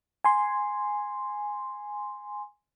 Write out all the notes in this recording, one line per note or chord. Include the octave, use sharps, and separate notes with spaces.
G#5 C6